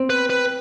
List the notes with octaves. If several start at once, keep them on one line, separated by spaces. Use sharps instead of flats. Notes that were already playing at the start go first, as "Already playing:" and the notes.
Already playing: C4
B4
B4